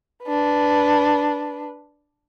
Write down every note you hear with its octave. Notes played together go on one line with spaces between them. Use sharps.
D4 B4